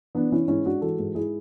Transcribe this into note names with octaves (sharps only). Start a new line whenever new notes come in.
E3 B3 D4
E3 C#4 E4
G#2 C#4 E4
G#2 D4 F#4
E3 F#4 A4
G#2
G#2 E4 G#4